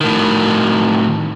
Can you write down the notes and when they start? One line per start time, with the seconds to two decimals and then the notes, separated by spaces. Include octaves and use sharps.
0.01 A2 D#3